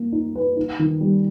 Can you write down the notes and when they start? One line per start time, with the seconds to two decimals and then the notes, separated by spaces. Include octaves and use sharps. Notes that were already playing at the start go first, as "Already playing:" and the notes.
Already playing: A#3
0.12 D#4
0.35 B4
0.57 D#4
0.79 D#3
1.01 G3